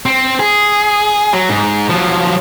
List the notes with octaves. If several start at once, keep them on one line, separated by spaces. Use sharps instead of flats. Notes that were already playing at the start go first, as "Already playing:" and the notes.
C4
G#4
F#3
G#2
F3 F#3